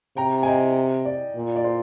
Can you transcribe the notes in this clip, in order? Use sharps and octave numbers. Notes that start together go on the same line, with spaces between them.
C3 G5 A#5
G#5
D#5 G5
D5
A#2
D5
C5